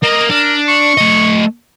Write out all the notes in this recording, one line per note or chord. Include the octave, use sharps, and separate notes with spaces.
A#3 D#5
D4 A#4
C#6
A3 D#5